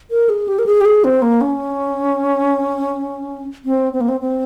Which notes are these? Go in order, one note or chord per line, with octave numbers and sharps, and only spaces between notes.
A#4
G#4
G4
A#4
G#4
G4
G#4
C4
A#3
C#4
C4
C4
A#3
C4
C4